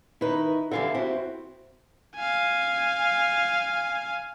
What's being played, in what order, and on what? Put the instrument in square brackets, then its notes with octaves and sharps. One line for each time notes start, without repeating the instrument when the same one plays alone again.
[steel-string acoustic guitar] D#3 B4 [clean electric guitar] D#4 E4
[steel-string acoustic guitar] D3 E3 G3 [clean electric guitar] A4 E5 F5
[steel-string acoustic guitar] C4 [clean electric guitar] E4 F#4
[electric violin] F5 G#5